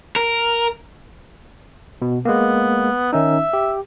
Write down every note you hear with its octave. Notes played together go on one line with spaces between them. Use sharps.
A#4
B2
G#3 A#3 B3
D#3 C#4 D#4 E5
G4